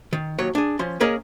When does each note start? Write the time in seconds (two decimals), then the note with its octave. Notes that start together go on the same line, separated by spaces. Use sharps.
0.13 D#3
0.39 D#2 F#3 C#5
0.55 D4 G#4
0.79 F3 C#4 C6
1.00 A#3 C#4 G#4 A#4 C#5 D#5